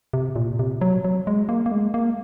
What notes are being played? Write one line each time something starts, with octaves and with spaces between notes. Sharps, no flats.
C3
A#2
C3
F#3
F#3
G#3
A#3
A#3
G#3
A#3